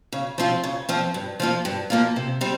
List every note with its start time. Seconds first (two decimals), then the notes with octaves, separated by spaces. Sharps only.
0.12 C#3
0.38 F3 C4 F4
0.64 C#3
0.89 F3 C4 F4
1.14 G2
1.40 F3 A#3 F4
1.65 G2
1.90 F3 A#3 F4
2.16 C3
2.41 G3 C4